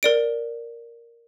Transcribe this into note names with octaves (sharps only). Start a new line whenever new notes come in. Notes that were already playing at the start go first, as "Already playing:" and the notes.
A#4 D5 D7